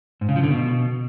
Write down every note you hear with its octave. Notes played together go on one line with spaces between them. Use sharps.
G#2
C#3
F3
D3
B2